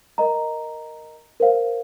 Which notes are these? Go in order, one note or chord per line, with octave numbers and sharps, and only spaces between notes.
A#4 D#5 A#5
A#4 C5 F5